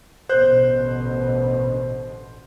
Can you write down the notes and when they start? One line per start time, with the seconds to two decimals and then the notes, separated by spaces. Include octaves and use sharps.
0.29 A1 B2 D3 C5 F#6 G6